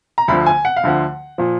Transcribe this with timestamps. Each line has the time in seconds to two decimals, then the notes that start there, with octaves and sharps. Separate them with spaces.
0.18 A#5
0.28 D2 D3 F3 B5
0.46 G#5
0.65 F#5
0.76 F5
0.83 D2 D3 F3 F#5
1.38 A#2 F3